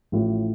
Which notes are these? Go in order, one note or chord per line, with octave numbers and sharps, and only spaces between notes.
A1 A2 F3